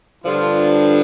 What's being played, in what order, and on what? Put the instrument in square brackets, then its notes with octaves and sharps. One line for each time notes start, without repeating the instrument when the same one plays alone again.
[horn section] G2 D3 F3 F4